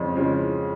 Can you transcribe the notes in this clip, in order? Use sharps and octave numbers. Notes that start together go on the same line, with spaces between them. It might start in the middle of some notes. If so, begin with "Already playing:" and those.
Already playing: F2 C#3 F3 G#3 C#4
C#3 F3 G#3 C#4